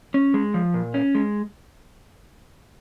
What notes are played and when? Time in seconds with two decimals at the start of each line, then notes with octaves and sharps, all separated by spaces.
0.14 C#4
0.34 G#3
0.54 F3
0.74 A#2
0.94 C#4
1.15 G#3